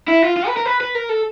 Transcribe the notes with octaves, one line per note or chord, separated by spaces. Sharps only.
E4
F4
F4
B4
A#4
B4
B4
A#4
A4